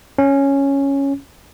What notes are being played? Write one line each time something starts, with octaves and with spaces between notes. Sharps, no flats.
C#4